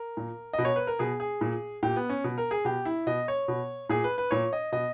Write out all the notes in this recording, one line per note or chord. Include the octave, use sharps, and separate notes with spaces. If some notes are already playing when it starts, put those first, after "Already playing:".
Already playing: A#4
A#2
D#5
B2
C#5
B4
A#4
B2 G#4
G#4
A#2
A#2 G4
B3
C#4
B2
A#4
G#4
B2 G4
E4
B2 D#5
C#5
B2
A#2 G#4
B4
B4
A#2 C#5
D#5
B2 D#5